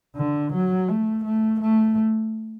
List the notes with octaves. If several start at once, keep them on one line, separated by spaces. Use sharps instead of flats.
D3
F#3
A3
A3
A3